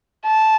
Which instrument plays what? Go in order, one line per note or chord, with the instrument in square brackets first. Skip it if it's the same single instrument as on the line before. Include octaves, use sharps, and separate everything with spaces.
[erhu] A5